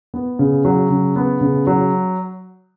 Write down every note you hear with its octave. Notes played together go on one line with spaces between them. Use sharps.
B3
C#3
F#3
C#3
B3
C#3
F#3